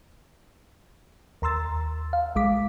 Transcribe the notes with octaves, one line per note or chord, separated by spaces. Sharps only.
D#2 A#5 C6 E6 A6
F5
A#1 G#3 D6 B6